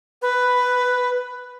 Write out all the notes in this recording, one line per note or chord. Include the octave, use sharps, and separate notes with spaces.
B4